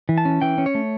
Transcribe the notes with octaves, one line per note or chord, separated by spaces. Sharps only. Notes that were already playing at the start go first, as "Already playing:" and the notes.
E3
A5
C#4
E3 G5
C#4
C#5
A3